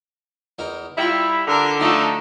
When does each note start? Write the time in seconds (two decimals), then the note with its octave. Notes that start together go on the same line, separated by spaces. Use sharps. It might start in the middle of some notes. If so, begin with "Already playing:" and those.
0.59 E2 D#4 A#4
0.97 G3 E4 F4 G5 A#5
1.48 D3 A#4
1.80 F3 A3 D#4 E4 F#5